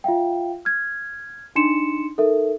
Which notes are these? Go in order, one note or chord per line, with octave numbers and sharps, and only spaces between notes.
F4 E5 F5 G5
F6 G#6
D4 D#4 C6 C#7 E7
D#4 A4 A#4 E5